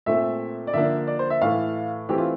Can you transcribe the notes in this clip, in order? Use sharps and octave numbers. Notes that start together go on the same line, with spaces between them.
A#2 A3 C4 E5
D5
D3 F3 A#3 D4 E5
D5
C5
E5
A2 E3 A3 F5
E3 A3 C4 G4
F4